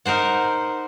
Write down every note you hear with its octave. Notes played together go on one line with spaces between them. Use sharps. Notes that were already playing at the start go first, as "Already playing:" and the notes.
D#4 A#4 C5 F#5